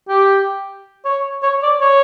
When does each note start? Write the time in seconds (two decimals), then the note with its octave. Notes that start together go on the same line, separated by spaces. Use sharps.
0.08 G4
1.05 C#5
1.43 C#5
1.63 D5
1.81 C#5